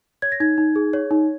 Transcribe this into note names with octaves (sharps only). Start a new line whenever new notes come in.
C#5 G#6
A#6
D#4 G#6
D#4
G#4
C#5
D#4